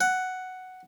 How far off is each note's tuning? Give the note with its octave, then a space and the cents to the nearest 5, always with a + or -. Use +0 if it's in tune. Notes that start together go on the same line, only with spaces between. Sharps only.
F#5 +5